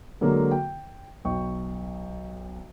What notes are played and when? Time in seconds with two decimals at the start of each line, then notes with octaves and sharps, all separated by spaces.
0.21 D3 F#3 G#3 A#3 A4
0.51 G5
1.25 B1 G5 C#6